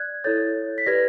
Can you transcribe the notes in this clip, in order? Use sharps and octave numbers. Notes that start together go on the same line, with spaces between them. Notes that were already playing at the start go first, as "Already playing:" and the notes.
Already playing: D5 F#6 G#6
E4 A4 C#5 G6 A6
B6
G4 B4 D5 G#6 A#6